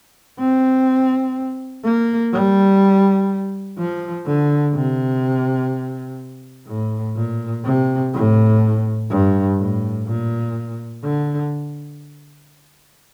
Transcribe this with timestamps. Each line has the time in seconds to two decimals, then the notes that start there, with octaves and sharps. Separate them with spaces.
0.39 C4
1.84 A#3
2.33 G3
3.78 F3
4.27 D3
4.74 C3
6.68 A2
7.17 A#2
7.65 C3
8.13 A2
9.10 G2
9.59 A2
10.07 A#2
11.04 D3